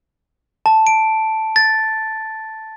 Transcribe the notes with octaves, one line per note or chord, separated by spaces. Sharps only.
A5
D7
A6